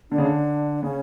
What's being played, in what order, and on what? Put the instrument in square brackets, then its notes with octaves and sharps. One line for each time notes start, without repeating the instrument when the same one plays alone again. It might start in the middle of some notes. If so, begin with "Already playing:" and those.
[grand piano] D3 [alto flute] D4
[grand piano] C#3
D3
[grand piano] C#3 [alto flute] C#4